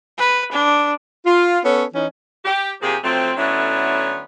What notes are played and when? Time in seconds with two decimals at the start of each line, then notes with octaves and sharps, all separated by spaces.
0.18 B4
0.52 D4
1.25 F4
1.64 B3 C#4 A4 C#5
1.94 E3 C#4 D#4
2.45 G4
2.82 C3 F3 A#3 G4 G#4
3.04 F3 F#3 A3 C4
3.37 D3 F#3 A3 B3 C#4 E4